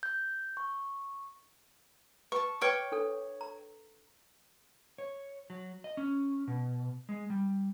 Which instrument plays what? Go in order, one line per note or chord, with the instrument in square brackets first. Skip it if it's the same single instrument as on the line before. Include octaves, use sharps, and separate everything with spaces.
[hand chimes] G6
C#6
[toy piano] B4 [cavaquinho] A5 C#6
[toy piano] B4 C#6 [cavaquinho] C#5 G5 D6
[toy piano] D4 A4
A#5
[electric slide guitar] C#5
F#3
D#5
C#4
B2
G#3
G3